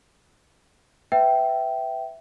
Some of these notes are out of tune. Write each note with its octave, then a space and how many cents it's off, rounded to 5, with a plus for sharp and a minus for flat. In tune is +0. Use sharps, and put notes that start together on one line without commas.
B4 +20 E5 +0 G5 -15